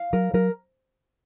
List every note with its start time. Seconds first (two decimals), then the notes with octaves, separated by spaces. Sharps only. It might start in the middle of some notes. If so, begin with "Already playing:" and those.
Already playing: F5
0.13 F#3 A#4
0.34 F#3 A#4